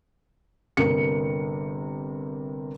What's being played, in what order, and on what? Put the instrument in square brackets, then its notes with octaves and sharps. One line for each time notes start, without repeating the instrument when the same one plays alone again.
[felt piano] G1 C3 A#3 C#7